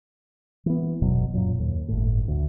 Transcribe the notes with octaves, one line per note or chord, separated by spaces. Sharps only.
E3 B3
F#1 D#2 B2 F#3
F#2 A#2 F#3
D#2
G1 A2
D2